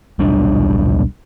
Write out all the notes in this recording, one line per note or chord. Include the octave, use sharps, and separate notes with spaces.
D#1 B1 G3 D4